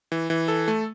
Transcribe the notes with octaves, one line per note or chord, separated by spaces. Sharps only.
E3
E3
A4
A3